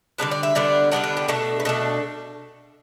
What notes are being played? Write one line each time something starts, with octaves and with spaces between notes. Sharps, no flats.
D3 G3 B3 D4 B4
D5
E5
D3 G3 B3 D4 D5
D3 G3 B3 D4 F#5
B4
G4
B2 A3 D4 A4
B4
B2 A3 D4 A4